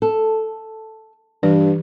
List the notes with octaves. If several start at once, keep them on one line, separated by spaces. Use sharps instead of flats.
A4
G2 E3 G4 B4